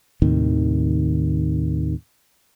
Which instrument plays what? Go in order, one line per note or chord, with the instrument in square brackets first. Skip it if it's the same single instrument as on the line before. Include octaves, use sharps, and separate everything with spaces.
[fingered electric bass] D#2 A2 C3 D#3